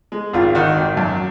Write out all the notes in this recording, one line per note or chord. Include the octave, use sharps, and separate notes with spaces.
G#3
G#1 F4
D#3 F#4
G#1
F#2